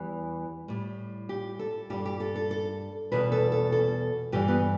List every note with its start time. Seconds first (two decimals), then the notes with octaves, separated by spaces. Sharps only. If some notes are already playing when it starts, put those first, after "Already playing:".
Already playing: E2 E3 G3 E4
0.68 A2 G3
1.29 G4
1.59 A4
1.90 G2 G3 G4
2.05 G4
2.20 A4
2.36 A4
2.51 A4
3.12 E2 B2 G3 B4
3.32 A4
3.52 A4
3.72 A4
4.32 G2 E3 G3 G4
4.48 B3